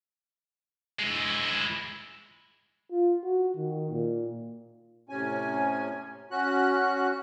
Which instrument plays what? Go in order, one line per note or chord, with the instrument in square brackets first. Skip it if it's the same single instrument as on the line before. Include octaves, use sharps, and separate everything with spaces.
[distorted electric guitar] G#3 E4
[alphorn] F4
F#4
D#3
A#2
[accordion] A2 C3 C#4 G#5
C#4 F#4 F#6